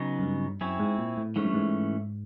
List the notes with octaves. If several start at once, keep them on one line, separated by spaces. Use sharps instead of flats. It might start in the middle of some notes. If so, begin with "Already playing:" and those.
Already playing: C#3 F#3 B3 D#4
F#2
G2
F#2 C4 E4 G#4 C#5
G#2
A#2
A2
G#2 E3 A3 C#4
G2
G#2